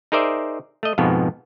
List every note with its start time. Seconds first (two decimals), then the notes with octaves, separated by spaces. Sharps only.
0.12 D#4 G#4 A#4 C5 D5 E5
0.83 A3 D#5
0.98 F2 G#2 B2 F3 B3